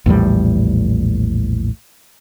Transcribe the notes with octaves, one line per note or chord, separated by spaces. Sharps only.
A#1 E2 A2 G3